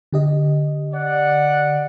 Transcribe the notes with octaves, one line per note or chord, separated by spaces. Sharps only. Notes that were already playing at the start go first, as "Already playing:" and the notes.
D3 G4 D#5
D5 F#5